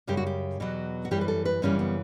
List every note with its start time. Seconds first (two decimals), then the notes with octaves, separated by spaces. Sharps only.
0.07 F#2 C#3 G3 G4
0.17 F#4
0.27 G4
0.60 E2 B2 F#3
1.05 F#4
1.11 F#2 E3 G3 G4
1.21 B4
1.28 A4
1.45 B4
1.62 F#2 C#3 E3 G3 C#4
1.79 B3